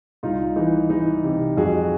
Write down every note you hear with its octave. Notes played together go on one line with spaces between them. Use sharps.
C2 D#4 F4
E3 D#4
E3 D#4
C3
F2 F#4 G#4